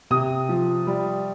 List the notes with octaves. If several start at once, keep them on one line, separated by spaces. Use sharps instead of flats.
C3 D#6
F3
G3